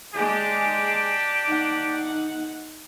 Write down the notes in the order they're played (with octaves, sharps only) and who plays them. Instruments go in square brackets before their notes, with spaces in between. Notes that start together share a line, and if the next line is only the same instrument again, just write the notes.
[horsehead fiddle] G#3 G#4 [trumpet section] D4 G4
[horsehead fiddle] D#4 F#5